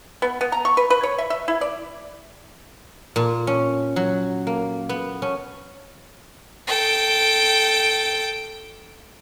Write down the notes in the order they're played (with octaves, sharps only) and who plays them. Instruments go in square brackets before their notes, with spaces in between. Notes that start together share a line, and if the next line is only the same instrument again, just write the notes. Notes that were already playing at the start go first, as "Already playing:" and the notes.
[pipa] B3
B3
A#5
C#6
B4
B4
C#5
E5
E5
E4
D5
[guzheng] A#2
C#4
F#3
A#3
B3
C#4
[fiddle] A4 G5